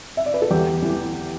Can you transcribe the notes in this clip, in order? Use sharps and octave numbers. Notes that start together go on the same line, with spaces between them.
E5
D5
B4
A4
E2 G4
E3